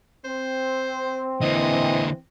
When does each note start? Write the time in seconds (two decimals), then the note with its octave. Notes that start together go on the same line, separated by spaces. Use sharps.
0.25 C4 C5
1.42 D3 E3 A#3 D#5